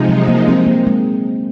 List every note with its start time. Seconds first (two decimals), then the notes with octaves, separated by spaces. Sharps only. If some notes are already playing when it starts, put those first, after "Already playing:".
Already playing: C3 F3 G#3 D#4
0.09 F#3
0.28 A#3
0.48 C4
0.66 A#3
0.87 G#3